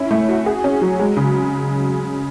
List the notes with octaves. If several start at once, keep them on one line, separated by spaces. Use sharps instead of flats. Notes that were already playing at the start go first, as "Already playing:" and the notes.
Already playing: C#4 E4
A3
F#4
G#4
C#4
F#3
G#3
C#3